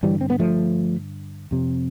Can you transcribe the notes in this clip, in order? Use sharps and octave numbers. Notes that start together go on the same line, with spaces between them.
G2 D3 E3 G3
C4
B3
F3 A3
F2 C3